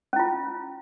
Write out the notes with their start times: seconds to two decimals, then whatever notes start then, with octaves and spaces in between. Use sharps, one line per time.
0.13 C#4
0.16 E4
0.19 F4